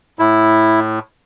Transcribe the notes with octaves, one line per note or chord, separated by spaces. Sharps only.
A2 E4